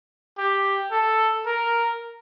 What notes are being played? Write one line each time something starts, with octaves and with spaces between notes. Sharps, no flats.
G4
A4
A#4